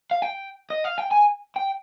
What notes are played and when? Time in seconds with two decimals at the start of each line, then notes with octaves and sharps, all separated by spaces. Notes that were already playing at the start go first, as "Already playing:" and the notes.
0.11 F5
0.22 G5
0.70 D#5
0.84 F5
0.98 G5
1.11 G#5
1.56 G5